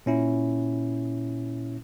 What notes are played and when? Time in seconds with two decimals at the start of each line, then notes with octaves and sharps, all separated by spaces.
0.06 A#2 C#4 E4